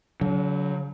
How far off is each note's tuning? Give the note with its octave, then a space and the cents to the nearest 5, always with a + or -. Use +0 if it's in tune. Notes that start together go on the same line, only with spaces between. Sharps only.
D3 -45 F#3 +5